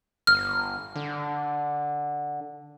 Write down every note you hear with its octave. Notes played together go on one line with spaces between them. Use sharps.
G1 F6
D3